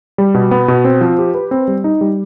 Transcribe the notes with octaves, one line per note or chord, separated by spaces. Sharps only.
G3
B2
B3
B2
C4
F3
G4
B4
C4
G3
D#4
G3